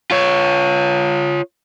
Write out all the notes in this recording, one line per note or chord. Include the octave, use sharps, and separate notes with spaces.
F4 C#5